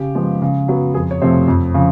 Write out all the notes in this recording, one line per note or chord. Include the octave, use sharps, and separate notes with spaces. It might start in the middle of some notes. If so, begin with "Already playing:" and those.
Already playing: C#3 G4
F3 G#3 B3
C#3
F#3 B3
F2 G#4
C#5
C3 F3 A3 C4 C5
F2
C#3 F3